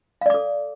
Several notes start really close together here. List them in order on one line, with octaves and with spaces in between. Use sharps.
F5 D5 D6 A4